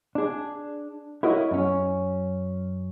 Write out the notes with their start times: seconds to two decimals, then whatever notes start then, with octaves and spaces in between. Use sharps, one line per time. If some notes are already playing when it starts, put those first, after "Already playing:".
0.15 D4 G#4
1.23 E4 F#4 A#4 C#5 D#5
1.51 F#2 C#4